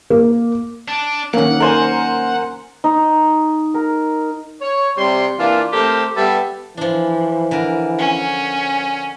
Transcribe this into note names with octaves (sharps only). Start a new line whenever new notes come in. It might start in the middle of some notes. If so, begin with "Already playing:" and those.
A#3
D4
D#3 F#3 A#3 C#4 F#5
A#4 C5 D5 G#5
D#4
A#4
C#5
C3 G3 C6
E3 A#3 D4 F4
A3 C4 G4 A4 A#4 C5
G3 B3 A4 B4 E5
E3 F3 D4
D3 A#4
C#4